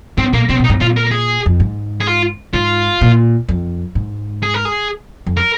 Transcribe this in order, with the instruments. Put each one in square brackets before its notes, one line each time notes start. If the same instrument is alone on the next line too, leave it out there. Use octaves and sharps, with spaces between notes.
[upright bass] G#2 [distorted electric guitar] C4
[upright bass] A#2 [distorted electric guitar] A#3
[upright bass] C3 [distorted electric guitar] C4
[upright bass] A#2 [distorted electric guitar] D#4
[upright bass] G#2
[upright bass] A#2 [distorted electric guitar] F4
[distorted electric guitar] A#4
G#4
[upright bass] F2
G#2
[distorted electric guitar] G#4
F4
[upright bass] G#2 [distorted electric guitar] F4
[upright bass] A#2
F2
G#2
[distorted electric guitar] G#4
A#4
G#4
[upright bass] F2
[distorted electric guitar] A#4